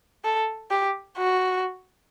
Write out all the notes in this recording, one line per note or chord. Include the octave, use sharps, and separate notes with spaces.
A4
G4
F#4